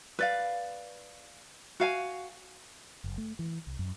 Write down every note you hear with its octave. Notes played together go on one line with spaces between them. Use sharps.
B4 D5 F5
F#4 F5 G#5
F#1
A3
E3
C2
F#2